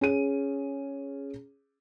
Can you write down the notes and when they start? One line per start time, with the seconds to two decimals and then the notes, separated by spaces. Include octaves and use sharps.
0.01 C#4 G#4 D#7